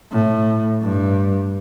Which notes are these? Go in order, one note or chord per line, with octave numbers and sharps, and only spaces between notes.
A2
G2